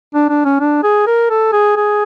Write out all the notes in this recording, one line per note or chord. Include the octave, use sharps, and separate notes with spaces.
D4
D4
C#4
D4
G#4
A#4
A4
G#4
G#4